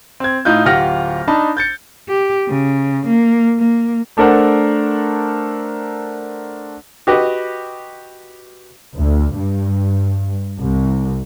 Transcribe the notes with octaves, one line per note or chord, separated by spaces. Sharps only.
C4 G#6
A2 D#4 F4 G6
D1 F4 G4 F#5 F6 A#6
D4 D#4 A5 B5
G6 A6 C#7
G4
C#3
A#3
A#3
A3 D4 A4 A#4 C5 F#5
F#4 G4 B4 D#5
D2
G2
C2